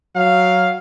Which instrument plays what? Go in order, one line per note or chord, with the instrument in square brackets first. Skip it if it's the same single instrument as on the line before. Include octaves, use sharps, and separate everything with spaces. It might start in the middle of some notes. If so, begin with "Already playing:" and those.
[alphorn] F#3 [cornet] F5